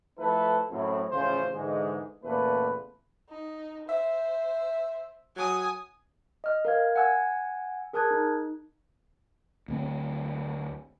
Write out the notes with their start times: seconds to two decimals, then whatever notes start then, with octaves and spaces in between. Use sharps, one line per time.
0.19 F3 A3 E4 A4 B4
0.71 F#2 A2 C4 E4
1.11 A1 C#3 F3 C5
1.53 G#2 D3 E3 G#3
2.23 E2 A#2 C#3 A3 B4
3.30 D#4
3.89 C5 E5
5.36 F#3 G#5 D#6
6.44 D#5 F6
6.65 A#4 F5 G#6
6.96 F#5 G#5 E6 G#6
7.93 G#4 A#4 A5 D#6 F#6 G#6
8.11 D#4
9.68 D2 G#3 C4